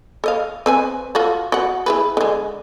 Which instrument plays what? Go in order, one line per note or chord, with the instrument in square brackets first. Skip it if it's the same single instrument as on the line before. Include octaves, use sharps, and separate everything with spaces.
[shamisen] A4 D#5 F5
C4 B4 G#5
F4 F#4 A4
F#4 F#5
E4 G#4 B4
D3 G#3